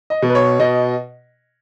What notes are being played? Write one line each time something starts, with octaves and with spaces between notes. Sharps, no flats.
D#5
B2
B4
C#5
B2 D#5